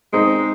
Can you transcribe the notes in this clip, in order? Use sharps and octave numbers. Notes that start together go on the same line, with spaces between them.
G#3 C4 D#4